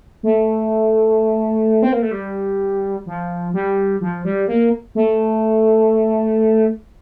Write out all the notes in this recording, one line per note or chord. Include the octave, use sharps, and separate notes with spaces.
A3
C4
A#3
A3
G3
F3
G3
F3
G3
A#3
A3